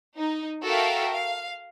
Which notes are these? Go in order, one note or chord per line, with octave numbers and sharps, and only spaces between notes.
D#4
F#4 A4 A#4 E5 F5 G5
F5